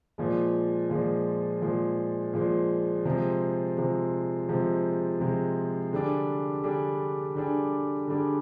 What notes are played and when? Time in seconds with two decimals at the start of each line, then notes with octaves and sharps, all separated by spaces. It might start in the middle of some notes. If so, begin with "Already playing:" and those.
0.18 A#2 F3 G#3
0.90 A#2 F3 G#3
1.62 A#2 F3 G#3
2.34 A#2 F3 G#3
3.05 C3 F3 G#3
3.78 C3 F3 G#3
4.49 C3 F3 G#3
5.20 C3 F3 G#3
5.93 D3 G3 D4 G#4
6.64 D3 G3 D4 G#4
7.35 D3 G3 D4 G#4
8.08 D3 G3 D4 G#4